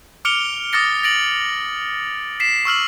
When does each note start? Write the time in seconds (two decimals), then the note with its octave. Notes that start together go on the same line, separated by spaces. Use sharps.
0.25 D6 F6 C#7 D7 F7 G7
0.73 D6 D#6 F6 A6 A#6 C#7
1.03 A6 A#6 D7 F#7
2.40 B6 C7 E7
2.65 C#6 E6 F6 F#7